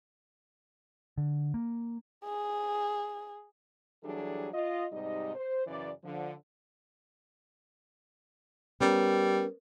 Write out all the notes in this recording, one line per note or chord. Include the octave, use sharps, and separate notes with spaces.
D3
A#3
G#4
E3 F#3 G3 D4 G#4 A4
F4 D#5
G#2 C3 G3 D#4 D#5
C5
F#2 C#3 E3 D5
D3 F3
G3 B3 C#4 A#4